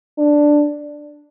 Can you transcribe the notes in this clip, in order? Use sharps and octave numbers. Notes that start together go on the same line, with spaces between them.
D4